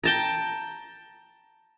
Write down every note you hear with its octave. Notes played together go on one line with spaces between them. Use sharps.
G5 A5 A#5